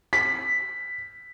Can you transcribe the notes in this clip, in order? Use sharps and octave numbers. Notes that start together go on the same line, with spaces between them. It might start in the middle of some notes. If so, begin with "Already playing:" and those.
B6